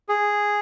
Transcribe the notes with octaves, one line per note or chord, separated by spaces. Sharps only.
G#4